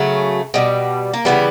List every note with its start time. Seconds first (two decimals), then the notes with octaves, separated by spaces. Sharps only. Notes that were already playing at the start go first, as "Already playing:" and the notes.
Already playing: C#3 F#3 A3
0.54 B2 G3
1.13 A#3
1.25 C#3 E3 G3 B3